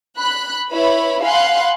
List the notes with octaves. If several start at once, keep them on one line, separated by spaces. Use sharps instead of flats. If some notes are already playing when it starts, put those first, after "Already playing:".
B5 F#6
E4 B4 C#5 B5
F5 F#5 G#5 B5 C6 F#6